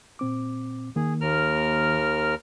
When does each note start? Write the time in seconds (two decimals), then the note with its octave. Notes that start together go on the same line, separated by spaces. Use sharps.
0.19 A#2 C4 D6
0.96 D#3 A#3 G#4
1.21 D#2 A#4 F6